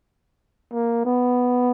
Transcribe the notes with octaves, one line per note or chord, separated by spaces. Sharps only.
A#3
B3